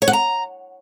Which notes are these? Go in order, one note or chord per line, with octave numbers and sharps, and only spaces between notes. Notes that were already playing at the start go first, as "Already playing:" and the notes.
C#5
F#5
A#5